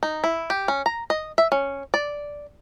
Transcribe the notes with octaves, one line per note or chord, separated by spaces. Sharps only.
D#4
E4
G4
C#4
A#5
D#5
E5
C#4
D5